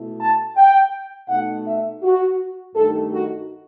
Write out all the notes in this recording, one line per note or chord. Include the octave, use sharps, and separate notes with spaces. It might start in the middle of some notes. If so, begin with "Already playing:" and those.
Already playing: B2 A3 E4
A5
G5
B2 A3 D#4 F#5
E5
F#4
G2 D#3 A3 D#4 A4
F#4